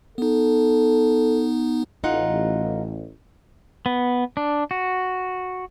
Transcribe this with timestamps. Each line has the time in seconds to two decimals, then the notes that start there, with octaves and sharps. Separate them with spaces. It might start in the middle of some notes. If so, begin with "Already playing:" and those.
0.18 B3 D#4 A4
2.04 A1 D#4 F4 F#5
3.86 B3
4.37 D4
4.71 F#4